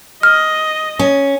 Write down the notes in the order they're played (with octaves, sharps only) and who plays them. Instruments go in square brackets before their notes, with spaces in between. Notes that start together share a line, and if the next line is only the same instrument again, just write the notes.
[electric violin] D#5 [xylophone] F6
[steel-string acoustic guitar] C#4